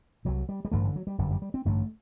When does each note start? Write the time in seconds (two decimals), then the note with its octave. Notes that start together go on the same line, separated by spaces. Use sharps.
0.25 C2 C3 F#3
0.49 G3
0.65 G3
0.72 A1 G2 D3 A3
0.84 D3
0.96 F#3
1.07 G3
1.18 G1 F#2 D3 G3
1.31 G3
1.42 G3
1.54 C4
1.65 A1 G2 D3 A3